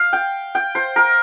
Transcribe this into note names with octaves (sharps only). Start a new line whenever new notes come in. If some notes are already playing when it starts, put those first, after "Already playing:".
Already playing: F5
G5
G5
C5
A#4